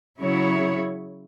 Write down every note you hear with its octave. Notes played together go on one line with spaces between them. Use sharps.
C#3 F#3 E4 C#5